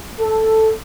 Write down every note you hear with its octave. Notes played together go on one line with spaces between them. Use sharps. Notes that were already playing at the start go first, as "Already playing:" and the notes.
A4